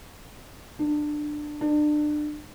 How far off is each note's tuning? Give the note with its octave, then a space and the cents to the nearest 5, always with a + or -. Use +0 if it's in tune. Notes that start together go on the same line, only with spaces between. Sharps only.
D4 +20
D4 +30